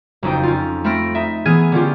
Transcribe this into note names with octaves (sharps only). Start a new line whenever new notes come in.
F#1 F2 D#4 G5
C#4 F4
A3 C4 B5 F6 A#6 D7
D#4 E5
E3 B3 G#4 F6 G#6 D#7
D3 C#4 F4 G4